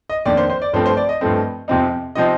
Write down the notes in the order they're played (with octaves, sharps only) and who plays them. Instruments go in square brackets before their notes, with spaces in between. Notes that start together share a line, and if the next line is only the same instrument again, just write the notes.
[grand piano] D#5
F2 D#3 A#3 D4 D5
C5
C5
D5
G2 F3 A3 C4 C5
C5
D5
D#5
G2 F3 A3 C4
F2 C3 F3 C4 D#4
C3 F3 C4 D#4 D#5